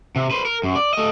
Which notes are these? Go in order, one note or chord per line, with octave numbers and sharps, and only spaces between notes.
C3
B4 C5
A#4
F#2
D5
A3 D#5